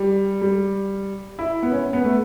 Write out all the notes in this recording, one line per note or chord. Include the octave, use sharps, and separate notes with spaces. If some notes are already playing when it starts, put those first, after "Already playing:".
Already playing: G3
G3
E4
B3
C#4
B3
A3